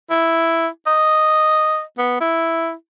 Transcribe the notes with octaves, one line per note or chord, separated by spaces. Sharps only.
E4
D#5
B3
E4